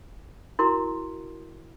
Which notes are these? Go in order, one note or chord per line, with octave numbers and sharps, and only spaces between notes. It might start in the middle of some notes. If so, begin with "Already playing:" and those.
E4 F#4 A#4 C6